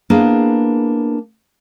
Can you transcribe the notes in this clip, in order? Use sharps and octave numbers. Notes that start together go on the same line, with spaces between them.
A#3 B3 D4 E4 G#4